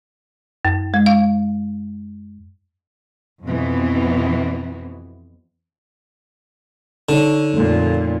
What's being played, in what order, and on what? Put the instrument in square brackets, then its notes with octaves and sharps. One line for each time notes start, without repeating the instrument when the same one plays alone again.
[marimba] F#2
G#3
F5
[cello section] F2 B2 E3 B3 C4
[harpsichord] D3 [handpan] D#4 C#5
[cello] F2 A#2 [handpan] A3 A#3